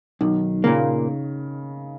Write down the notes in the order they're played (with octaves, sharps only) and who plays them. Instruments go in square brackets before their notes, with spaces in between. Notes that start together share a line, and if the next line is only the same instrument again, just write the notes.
[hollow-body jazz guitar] B1 [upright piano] D#3
[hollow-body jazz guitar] A#2 A#3 [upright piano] C#3